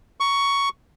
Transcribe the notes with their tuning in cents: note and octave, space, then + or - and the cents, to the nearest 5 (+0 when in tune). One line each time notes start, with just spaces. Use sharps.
A#5 +20 C#6 +10